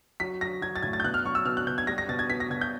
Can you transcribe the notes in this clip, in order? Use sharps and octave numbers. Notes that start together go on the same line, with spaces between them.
F#3 B6
F#3 A#6
F#3 G#6
A6
A2 G#6
A6
G6
B2 F#6
F6
F#3 C#6
E6
B2 F6
F#6
B2 G6
G#6
G3 A#6
A#6
B2 A6
G#6
B2 B6
A#6
B2 G#6
G6